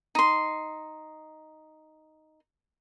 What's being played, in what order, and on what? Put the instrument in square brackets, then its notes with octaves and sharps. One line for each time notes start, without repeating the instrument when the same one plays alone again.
[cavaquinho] D#4 C6